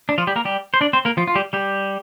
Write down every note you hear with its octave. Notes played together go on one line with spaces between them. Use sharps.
D4
F3 F4
G3 G4
A#3 A#4
G3 G4
C5
D4 D5
C4 C5
A#3 A#4
F3 F4
F4
G3 G4
G3 G4